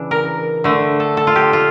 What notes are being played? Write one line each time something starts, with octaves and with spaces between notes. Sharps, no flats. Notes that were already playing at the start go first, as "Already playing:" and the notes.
Already playing: C#3 E3 D4
A#4
D3 A3
A4
A4
F4
G4
F4